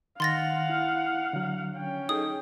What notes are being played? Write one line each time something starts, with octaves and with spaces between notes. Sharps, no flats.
D#3 F5 F#5 C6 A6 A#6
E4
D3 F#3
C#4 G5
D#4 G#4 A4 D#6